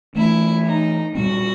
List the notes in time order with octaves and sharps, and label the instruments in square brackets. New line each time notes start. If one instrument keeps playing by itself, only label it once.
[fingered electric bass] E3 A3 D4 [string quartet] E4
[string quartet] D#4
[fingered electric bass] A#2 G3 C4 [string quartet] F#4